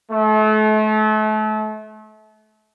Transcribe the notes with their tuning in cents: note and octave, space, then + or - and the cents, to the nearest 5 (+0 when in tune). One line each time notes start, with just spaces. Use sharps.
A3 -35